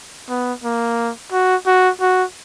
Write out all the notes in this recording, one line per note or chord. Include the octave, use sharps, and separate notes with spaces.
B3
A#3
F#4
F#4
F#4